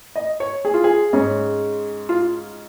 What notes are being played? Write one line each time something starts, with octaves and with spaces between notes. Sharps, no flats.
D#5
C#5
G#4
F4
G#4
G#2 G#3 C#4
F4